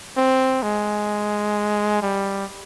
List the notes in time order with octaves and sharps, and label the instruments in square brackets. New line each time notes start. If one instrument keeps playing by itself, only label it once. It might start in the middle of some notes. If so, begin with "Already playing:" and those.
[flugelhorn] C4
G#3
G3